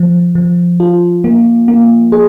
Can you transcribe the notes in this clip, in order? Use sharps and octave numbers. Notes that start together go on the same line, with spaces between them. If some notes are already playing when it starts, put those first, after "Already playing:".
Already playing: F3
F3
F4
A#3
A#3
G#4